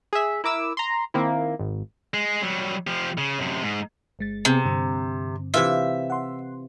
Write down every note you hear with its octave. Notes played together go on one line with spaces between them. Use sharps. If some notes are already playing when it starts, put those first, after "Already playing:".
G#4 E5
E4 A#4 D6 E6
A#5 C6
D#3 A#3 C4 E4
G#1
G#3
F#3 G3
F3 G4
C#3
F#2 C3
G#2
G1 G#3 A6
C3 B3 C4 G#4
G2 D3 C4
C3 E3 F4 E5
F#5 C6